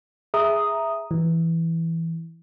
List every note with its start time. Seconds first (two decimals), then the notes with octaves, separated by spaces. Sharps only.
0.34 G#4 E5 A#5 D#6
1.11 E3